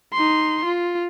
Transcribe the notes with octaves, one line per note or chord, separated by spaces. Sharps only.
D#4 C6
F4